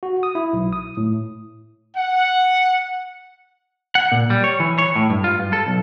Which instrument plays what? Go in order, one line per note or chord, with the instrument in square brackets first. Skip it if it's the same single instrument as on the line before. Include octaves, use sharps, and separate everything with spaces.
[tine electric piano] F#4
D#6
E4
B1
D#6
A2
[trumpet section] F#5
[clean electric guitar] F#5
A#2
G3
C#5
E3
C#5
A2
G2
F4
G2
A4
B1